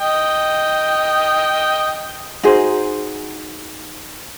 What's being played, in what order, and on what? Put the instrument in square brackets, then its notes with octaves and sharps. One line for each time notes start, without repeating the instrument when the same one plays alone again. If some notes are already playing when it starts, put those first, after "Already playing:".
[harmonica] D#5 G5
[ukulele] D#4 F#4 G#4 C5